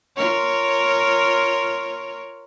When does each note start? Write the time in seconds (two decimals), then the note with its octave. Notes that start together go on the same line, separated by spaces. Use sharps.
0.16 F4 A#4 C#5